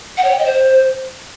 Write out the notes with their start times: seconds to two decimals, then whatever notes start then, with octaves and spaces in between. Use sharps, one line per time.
0.17 F#5
0.24 C#5
0.31 G5
0.38 D#5
0.45 C5